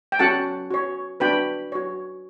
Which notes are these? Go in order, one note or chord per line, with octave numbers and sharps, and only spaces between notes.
G5
C#4 F#4 A4 F#5 A5
F#4 C#5
D4 F#4 B4 G5 B5
F#4 C#5